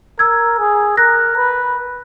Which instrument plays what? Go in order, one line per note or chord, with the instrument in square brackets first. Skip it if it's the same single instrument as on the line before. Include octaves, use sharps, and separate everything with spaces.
[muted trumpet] A#4 [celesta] E6 G#6
[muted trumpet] G#4
[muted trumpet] A#4 [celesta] F#6 A#6
[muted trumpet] B4